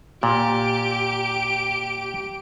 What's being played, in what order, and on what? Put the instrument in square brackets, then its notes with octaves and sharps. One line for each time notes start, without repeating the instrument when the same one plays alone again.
[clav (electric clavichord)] A#2 [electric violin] G4 D7